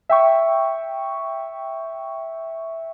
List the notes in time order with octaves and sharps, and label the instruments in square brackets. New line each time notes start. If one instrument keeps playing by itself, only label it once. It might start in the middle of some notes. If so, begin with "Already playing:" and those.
[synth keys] E5 G5 C#6